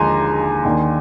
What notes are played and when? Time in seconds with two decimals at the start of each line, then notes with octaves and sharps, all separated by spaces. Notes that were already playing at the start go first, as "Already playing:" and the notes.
Already playing: D#2 D3 F3 G#3 G#5 A#5 C6
0.65 D#2 D#3 A#3 D4